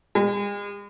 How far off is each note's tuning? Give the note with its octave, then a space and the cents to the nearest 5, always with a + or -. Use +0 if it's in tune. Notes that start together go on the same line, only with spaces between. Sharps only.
G#3 -45